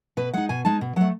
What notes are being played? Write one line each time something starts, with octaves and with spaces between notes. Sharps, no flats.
B2 B4
G#3 D#4 F#5
B2 G#5
G#3 D#4 A5
B2
F#3 A3 F#5